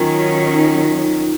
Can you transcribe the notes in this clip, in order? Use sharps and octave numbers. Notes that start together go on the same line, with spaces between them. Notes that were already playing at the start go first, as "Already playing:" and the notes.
Already playing: D#3 F#3 C#4 F4
D#4